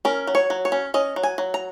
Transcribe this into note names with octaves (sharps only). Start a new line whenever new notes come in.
C#4 A#4
F#3
C#5
F#3
C#5
C#4
C#4 D#5
F#3
G#5
F#3
A#5